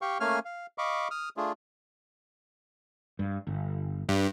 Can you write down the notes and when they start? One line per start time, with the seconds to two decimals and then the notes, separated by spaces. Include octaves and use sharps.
0.02 G4 F5 G5 C#6
0.20 A3 A#3 C#4 F5 G#5 F6
0.45 F5
0.78 D#5 F5 B5 C#6 D6
1.11 D#6 F6
1.37 A3 D4 F4 G#4
3.19 G2
3.47 G1
4.09 G2